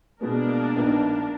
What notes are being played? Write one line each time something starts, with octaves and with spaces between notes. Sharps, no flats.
B2 G#3 A#3 B3 D4 A#4
A#1 B3 D#4